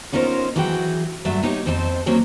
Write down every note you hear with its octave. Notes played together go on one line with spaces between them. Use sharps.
B3 C#4 D#4 F4 A#4 C5
E3 F#3 F#4 G#4 C5 G5
G2 F#3 A3 E5
B3 D#4 G4 C#5 D#5
F2 C4 D#4 C5 A5
D#3 F#3 A#3 C4 C#4